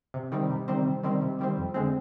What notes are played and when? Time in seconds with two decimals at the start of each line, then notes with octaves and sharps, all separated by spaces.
0.14 C3
0.32 D#3 G3 C4
0.50 C3
0.68 D#3 G3 C4
0.86 C3
1.03 D#3 G3 C4
1.21 C3
1.39 D#3 G3 C4
1.57 F2
1.74 D3 G#3 C4